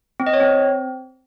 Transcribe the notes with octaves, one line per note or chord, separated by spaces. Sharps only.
C4
D#5
C#5
C4